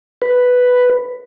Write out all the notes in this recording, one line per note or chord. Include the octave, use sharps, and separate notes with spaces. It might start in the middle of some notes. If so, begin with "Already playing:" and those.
B4